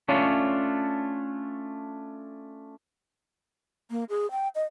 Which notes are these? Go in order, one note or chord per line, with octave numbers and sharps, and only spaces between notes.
A3 C#4 D4 F4 C#5
A#3
G#4
G5
D#5